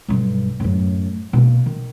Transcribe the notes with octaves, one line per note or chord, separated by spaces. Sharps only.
B1 G2
F#2 A2
B2 A#3
D#3